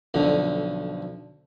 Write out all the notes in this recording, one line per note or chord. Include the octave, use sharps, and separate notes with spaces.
B1 F2 D3